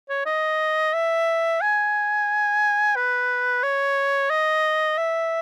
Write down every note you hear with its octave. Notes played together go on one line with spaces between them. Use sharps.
C#5
D#5
E5
G#5
B4
C#5
D#5
E5